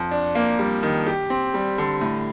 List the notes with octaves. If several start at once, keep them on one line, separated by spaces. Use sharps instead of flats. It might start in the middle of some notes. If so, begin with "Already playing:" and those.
Already playing: F2
D4
A#3
G3
D#3
G4
C4
G3
D3
A2